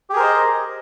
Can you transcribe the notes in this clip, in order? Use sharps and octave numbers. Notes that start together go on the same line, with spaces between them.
G4 G#4 A#4 C5 D#5